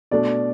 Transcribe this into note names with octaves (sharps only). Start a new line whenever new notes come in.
B2 A3 D4 D5